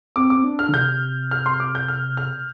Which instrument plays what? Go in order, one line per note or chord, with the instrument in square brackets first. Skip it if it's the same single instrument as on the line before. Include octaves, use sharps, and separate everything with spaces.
[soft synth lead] C4 [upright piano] D6
[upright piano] D6
[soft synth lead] C4
D4
[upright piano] F6
[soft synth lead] D3
[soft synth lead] C3 [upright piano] G6
[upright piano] F6
C6
D6
G6
F6
F6